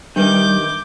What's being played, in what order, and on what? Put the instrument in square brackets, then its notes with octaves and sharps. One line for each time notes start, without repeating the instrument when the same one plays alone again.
[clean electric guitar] D#3 [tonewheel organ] G3 [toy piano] D4 B4 E5 [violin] D6 G6